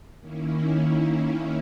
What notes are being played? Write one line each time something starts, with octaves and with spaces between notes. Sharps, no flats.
D#3 A#3 C#4 E4